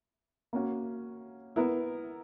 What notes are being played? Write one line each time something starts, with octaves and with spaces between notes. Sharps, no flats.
A#3 C#4 F#4
B3 E4 A#4